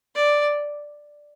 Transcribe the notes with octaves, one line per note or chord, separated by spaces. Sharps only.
D5